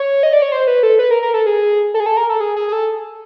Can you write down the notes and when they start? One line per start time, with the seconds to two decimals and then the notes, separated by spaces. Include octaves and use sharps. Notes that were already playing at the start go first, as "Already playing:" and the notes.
Already playing: C#5
0.23 D#5
0.33 D5
0.42 C#5
0.52 C5
0.67 B4
0.83 A4
0.99 B4
1.11 A#4
1.22 A#4
1.34 A4
1.46 G#4
1.94 A4
2.00 G#4
2.06 A4
2.17 A#4
2.29 A4
2.41 G#4
2.56 G#4
2.69 G#4
2.72 A4